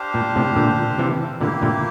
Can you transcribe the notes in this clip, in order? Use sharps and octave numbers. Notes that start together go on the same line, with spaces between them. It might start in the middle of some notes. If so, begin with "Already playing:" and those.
Already playing: D4 G4 C5 F5
A#2
A2 C3
A#2 D3
C3 E3
A#2 D3 A#3 E4 G4
A#2 D3